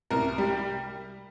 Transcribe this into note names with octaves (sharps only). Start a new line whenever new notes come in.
C2 A#4
G3